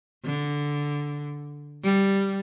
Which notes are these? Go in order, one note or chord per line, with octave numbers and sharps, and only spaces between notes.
D3
G3